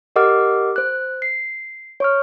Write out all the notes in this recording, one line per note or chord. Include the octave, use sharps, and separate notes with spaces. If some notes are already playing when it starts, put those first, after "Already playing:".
G4 A#4 D#5 F#5 D6 F6
C5 F#6
C7
C#5 C#6 F6